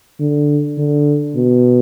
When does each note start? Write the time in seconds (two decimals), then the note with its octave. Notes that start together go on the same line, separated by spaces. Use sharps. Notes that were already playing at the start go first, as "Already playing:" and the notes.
0.20 D3
0.78 D3
1.35 B2